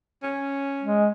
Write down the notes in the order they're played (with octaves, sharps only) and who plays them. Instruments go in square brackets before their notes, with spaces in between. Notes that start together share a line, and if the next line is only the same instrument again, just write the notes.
[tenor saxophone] C#4
[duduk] G#3